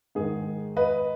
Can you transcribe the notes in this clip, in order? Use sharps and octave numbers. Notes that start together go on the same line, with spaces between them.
G#2 D#3 G#4
B4 D#5